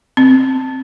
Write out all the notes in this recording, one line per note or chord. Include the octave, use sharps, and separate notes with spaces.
C4